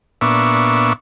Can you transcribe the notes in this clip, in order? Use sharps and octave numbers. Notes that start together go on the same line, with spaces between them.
A#2 B3 D4 E5 C#6